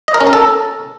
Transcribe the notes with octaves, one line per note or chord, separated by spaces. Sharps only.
D#5
A#4
C#4
A#4
A4